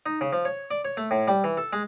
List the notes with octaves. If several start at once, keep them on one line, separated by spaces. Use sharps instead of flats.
D#4
C#3
F3
C#5
D5
C#5
A3
A2
G3
E3
A4
G#3